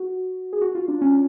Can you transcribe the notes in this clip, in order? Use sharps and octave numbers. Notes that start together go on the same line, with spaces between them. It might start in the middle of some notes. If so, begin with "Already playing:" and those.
Already playing: F#4
G#4
F#4
F4
D4
C#4